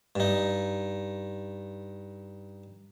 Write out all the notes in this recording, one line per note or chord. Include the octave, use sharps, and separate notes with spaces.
G2 D#4